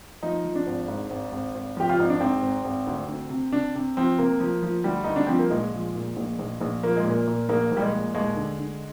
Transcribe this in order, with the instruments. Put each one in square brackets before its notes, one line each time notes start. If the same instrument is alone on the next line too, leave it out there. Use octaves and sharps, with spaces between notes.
[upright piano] F3 D#4
F3
D4
G#1
G#2
G#1
G#1
G#1
F3 G4
F4
G#1 D#4
D4
G#2 C4
G#1
G#1
D2
D2
C3
C3 D4
C3
F3 C4
C3 A#3
F3
F3
D2 G3
D2 D#4
D4
F3 C4
A#3
A#1 G#3
F3
A#2
A#1
A#1
A#1
F3 A#3
G#3
A#2
A#3
A#2
A#1 A#3
A#1
G3
G#3
A#2
D#2 G#3
D3
D3